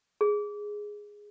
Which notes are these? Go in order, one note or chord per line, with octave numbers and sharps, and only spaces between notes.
G#4